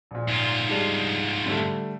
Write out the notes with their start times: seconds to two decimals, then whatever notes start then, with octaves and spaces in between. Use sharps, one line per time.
0.11 A#1 A#2
0.28 G#2 F4
0.69 G3 G#3 D4
1.46 D3 G3 A3